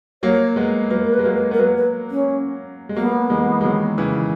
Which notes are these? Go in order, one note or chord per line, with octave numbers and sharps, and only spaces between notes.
F#3 A#3 C#5
G#3 B3
F#3 A#3 B4
A#4
B4
G#3
F#3 A#3
B4
B3 A#4
F#3 A#3 B4
B4
C#4
G#3
F#3 A#3 B3
E3 G#3
G#3
D#3 F#3
C#3 E3